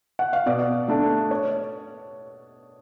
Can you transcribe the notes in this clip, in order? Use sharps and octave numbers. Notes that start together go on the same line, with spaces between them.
F#5
F5
B2 D5
A3 D4
C#5